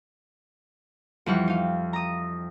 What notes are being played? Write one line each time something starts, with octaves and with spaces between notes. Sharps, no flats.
F2 E3 G3 F#5 F6
D#4 F5
A#5 D#6